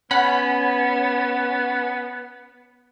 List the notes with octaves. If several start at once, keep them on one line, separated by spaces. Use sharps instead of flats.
B3 C#4 F#5 B5